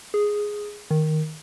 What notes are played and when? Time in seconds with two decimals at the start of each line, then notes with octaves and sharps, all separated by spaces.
0.14 G#4
0.91 D#3